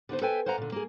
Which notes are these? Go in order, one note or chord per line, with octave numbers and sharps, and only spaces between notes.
D3 B3 D#4 C5
A4 B4 C5 E5 G5 G#5
C5 F5 F#5 G#5 A#5
A#2 D3
A#3 G#4